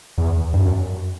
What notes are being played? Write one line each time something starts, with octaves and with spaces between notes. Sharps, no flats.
E2
G2
F#2